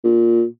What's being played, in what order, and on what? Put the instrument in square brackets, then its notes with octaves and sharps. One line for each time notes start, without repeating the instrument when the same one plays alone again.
[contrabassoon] A#2